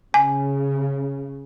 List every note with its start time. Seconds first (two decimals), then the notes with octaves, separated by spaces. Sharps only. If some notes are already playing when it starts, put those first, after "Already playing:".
0.14 C#3 G#5